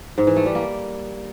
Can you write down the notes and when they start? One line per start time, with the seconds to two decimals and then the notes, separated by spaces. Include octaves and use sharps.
0.18 G#2
0.27 E3
0.36 A3
0.46 G3
0.55 A#3